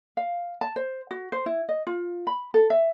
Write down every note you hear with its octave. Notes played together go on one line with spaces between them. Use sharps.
F5
A5
C5
F#4
C5
E4
D#5
F4
B5
A4
E5